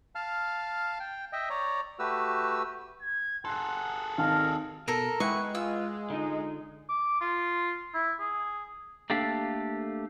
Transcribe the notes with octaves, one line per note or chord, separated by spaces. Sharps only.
F5 A5 F6
G5
D#5 E5 G5
C#5 D5 A#5
A3 F#4 G4 B4 E6
G#6
G#4 A4 F#5 C6 F#6
G#1 D#4 A#4 F5 A5
B2 A4 A#4
G#3 E4 B4 F#5 G5 C#6
F4 E6
D3 D#4 F4
D6
F4
E4
G#4
A3 A#3 D4 G4 A4 F5